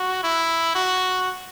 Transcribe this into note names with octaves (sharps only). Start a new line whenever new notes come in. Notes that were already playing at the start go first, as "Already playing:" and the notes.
Already playing: F#4
E4
F#4